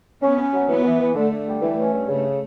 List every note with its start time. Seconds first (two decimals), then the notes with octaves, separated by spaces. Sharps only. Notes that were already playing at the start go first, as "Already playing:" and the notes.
0.23 B3 C#4
0.38 C#4
0.54 F#3
0.69 E3 B3
0.85 E3
1.00 E3
1.15 D3 A3
1.32 D3
1.47 G3
1.62 E3 A3
1.78 C#4
1.94 G2
2.09 C#3 A3